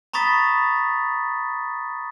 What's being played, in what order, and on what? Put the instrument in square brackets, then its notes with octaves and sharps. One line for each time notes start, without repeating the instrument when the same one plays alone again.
[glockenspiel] A#5 B5 C#6 D#6 A6 B6